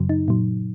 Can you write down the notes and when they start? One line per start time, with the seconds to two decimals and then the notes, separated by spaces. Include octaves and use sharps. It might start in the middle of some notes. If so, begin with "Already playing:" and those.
Already playing: F#2 C#3 F#3
0.09 D#4
0.28 A#2 F#3